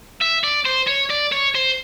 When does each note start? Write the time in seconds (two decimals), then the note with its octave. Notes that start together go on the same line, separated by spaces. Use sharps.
0.21 E5
0.44 D5
0.66 C5
0.87 C#5
1.10 D5
1.32 C#5
1.55 C5